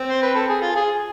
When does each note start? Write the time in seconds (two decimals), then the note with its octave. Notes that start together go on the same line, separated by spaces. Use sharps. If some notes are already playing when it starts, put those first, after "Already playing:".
Already playing: C4
0.09 C5
0.22 B4
0.35 A4
0.49 G#4
0.62 F4
0.75 G#4